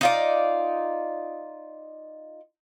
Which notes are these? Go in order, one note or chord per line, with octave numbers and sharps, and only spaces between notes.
D#4 F4 D5